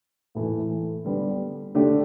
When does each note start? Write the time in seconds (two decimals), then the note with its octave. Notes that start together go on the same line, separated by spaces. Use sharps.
0.35 A2 E3 A3
1.05 D3 G3 B3
1.75 D3 A3 D4 G4